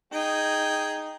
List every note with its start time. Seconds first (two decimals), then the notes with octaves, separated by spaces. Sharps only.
0.13 D#4 G#4 G5